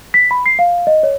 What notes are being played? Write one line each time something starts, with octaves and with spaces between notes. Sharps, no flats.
B6
B5
C7
F5
D#5
C#5